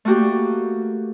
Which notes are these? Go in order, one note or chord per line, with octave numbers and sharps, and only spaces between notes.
A3 A#3 F#4 G4